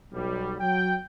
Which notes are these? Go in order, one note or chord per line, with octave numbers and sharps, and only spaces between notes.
B1 F#3 G3
F#3 G5